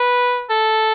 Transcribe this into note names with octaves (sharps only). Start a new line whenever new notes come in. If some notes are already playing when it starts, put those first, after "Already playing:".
Already playing: B4
A4